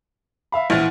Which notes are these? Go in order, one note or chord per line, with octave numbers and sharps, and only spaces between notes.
E5 F5 B5
A#1 E3 F#5 F6 A6